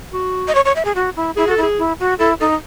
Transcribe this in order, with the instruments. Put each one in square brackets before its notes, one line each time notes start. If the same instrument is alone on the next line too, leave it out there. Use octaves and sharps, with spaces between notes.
[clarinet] F#4
[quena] D#5
C#5
C#5
E5
G#4
F#4
E4
[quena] E4 [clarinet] G#4
[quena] F#4
[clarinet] A4
[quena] E4
[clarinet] G#4
[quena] E4
F#4
[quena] E4 [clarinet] A4
[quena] D#4 [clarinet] A4